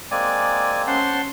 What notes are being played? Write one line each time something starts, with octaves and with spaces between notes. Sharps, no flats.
G#3 A#3 C4 D5 G#5
C#4 C5 F#5 A5 C6